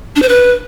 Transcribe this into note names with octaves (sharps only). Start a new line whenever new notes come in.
D4
C5
B4